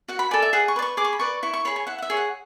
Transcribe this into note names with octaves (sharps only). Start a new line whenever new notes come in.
F#4 F#5
B5
A4 D5 G#5
E5
G#4 F#5
C#6
B4 D5
C#6
G#4 D6
C#6
B5
B4 D5 C#6
E4 C#6
C#6
G#4 C#5 B5
G#5
E4 F#5
F#5
E5
G#4 C#5
F#5